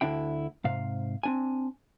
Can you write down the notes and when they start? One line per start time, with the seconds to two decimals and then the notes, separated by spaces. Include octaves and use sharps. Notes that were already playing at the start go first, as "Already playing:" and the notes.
0.01 D2 D3 D4 E4 G5
0.64 G#2 C3 F5
1.23 C4 D4 G#5